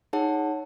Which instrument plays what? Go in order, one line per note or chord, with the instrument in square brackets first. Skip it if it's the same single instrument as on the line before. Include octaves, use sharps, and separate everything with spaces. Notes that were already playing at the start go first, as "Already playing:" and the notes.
[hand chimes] D#4 G#4 C#5 F#5 A5